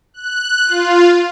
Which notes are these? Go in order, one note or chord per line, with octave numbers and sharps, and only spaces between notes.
F#6
F4